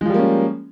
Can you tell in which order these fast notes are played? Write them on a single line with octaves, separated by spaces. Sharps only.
G#3 F3 G3 A#3 C#4